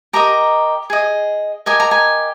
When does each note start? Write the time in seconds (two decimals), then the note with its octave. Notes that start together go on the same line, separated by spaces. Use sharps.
0.13 G4 A#4 D#5 A#5
0.90 G#4 D#5
1.66 G4 A#4 D#5 G#5
1.80 A#5
1.91 G#5